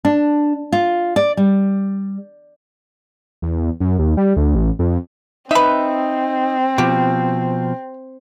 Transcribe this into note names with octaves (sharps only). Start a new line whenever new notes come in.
D4
F4
D5
G3
E2
F#2
D#2
G3
D2
A1
F2
C4 D#4 B4 E5
B2 F3 G4